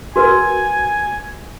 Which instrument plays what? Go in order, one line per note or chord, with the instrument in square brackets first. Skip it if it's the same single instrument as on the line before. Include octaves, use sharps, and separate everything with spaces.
[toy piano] F#4 A#4 B4 [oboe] G#5